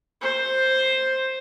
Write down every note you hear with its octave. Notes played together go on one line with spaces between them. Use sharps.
C5